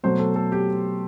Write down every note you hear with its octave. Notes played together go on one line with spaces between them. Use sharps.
B2 F#3 A3 C5
A4
A4
G4